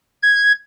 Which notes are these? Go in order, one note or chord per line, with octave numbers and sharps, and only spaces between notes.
G#6